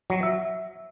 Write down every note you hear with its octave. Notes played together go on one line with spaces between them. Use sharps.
F#3
E5